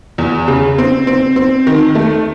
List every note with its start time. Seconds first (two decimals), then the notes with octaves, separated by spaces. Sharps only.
0.18 E2
0.48 C#3
0.78 C4
1.07 C4
1.36 C4
1.67 D#3
1.95 A3